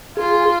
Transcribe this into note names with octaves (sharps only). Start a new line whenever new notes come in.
F4 G#4